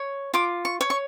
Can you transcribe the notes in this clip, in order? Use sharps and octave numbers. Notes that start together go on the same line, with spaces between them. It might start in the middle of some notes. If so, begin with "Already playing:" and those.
Already playing: C#5
F4 D6
C#6
C#5
C#6